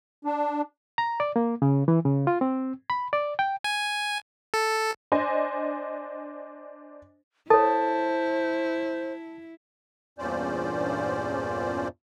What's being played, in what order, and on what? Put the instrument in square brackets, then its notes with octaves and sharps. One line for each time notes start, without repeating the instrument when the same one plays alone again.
[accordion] D4
[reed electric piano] A#5
D5
A#3
C#3
E3
C#3
F4
C4
B5
D5
G5
[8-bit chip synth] G#5
A4
[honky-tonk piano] D4 C5 D#5 G#5
[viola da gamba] E4 [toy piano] A4 C#5 [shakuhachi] C5 [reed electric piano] A5
[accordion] E2 G2 A#2 C#4 C5 D5